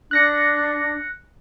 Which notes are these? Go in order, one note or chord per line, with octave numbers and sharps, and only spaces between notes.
D4 F#6 A#6 C#7